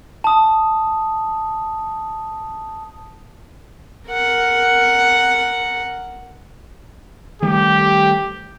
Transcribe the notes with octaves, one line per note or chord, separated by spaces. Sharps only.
A5 D#6
A#4 F#5
D#3 G3 A3 G4